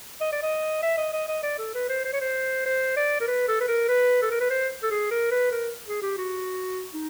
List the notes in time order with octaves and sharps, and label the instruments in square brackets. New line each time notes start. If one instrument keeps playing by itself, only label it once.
[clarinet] D#5
D5
D#5
E5
D#5
D#5
D#5
D5
A4
B4
C5
C5
C#5
C5
C5
D5
A#4
B4
A4
B4
A#4
B4
A4
A#4
B4
C5
A4
G#4
A#4
B4
A#4
G#4
G4
F#4
D#4